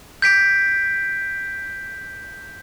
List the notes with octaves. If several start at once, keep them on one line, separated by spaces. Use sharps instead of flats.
G6 B6 D7